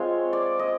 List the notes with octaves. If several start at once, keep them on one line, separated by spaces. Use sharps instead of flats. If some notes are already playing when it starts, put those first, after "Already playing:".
Already playing: G#3 C4 F4 C#5
D5
D#5